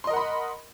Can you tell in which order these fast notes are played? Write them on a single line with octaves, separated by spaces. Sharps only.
C6 D#5 A#4 F#5 B5